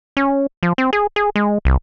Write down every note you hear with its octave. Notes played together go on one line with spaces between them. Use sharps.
C#4
F3
C4
G#4
G#4
G#3
C2